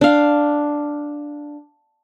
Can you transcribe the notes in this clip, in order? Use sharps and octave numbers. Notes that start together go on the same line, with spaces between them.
D4 F5